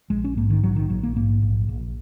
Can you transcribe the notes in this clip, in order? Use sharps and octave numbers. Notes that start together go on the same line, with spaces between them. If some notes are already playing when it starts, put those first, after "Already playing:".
A#1 G#3
C#4
G#2 A#3
D#3
A#1 F#3
D#3
A#1 F#3
A#3
G#2 A#3
A#1
A#1